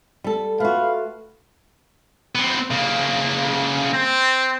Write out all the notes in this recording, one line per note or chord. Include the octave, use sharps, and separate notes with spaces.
G3 A4
A3 F4 F#4 B4 F5
B3 C4
C#3 A#3
C4